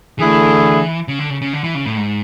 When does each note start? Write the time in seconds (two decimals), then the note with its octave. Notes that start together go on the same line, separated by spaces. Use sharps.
0.18 D3 E3 A3 E4 G#4
1.08 C#3
1.19 D3
1.30 C#3
1.42 C#3
1.53 D3
1.64 E3
1.75 C#3
1.86 A2
1.97 G#2